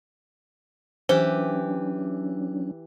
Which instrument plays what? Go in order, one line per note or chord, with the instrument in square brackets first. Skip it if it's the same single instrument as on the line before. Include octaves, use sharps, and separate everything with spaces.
[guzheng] E3 G4 [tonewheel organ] F#3 C#4 D4 [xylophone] C5